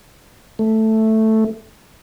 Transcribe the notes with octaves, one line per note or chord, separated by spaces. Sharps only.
A3